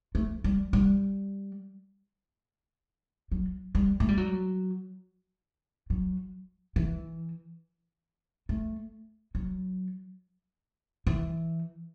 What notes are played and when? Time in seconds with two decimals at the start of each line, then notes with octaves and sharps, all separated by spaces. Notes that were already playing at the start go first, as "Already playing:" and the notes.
0.15 A3
0.44 G3
0.73 G3
3.32 F#3
3.75 G3
4.00 A3
4.08 G3
4.17 F#3
5.90 F#3
6.76 E3
8.49 A3
9.35 F#3
11.07 E3